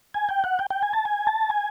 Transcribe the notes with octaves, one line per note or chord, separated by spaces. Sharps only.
G#5
G5
F#5
G5
G5
G#5
A5
G#5
A5
G#5